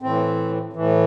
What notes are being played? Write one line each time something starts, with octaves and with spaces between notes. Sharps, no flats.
A2 E3 C4
A2 E3